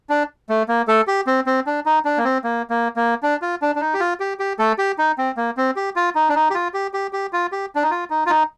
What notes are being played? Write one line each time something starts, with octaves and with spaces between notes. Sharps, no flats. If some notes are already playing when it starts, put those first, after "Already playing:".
D4
A3
A#3
A3 A4
G4
C4
C4
D4
D#4
D4
A#3
C4
A#3
A#3
A#3
D4
F4
D4
D4
D#4
G4
F4
G4
G4
A3 A4
G4
D#4
C4
A#3
C4
G4
F4
D#4
D4
D#4
G4
F4
G4
G4
G4
F4
G4
D4
D#4
F4
D#4
F4
D#4